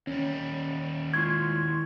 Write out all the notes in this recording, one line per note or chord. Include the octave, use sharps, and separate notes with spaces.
D#2 G3 C#4
G#3 E4 F4 C6 C#6 G#6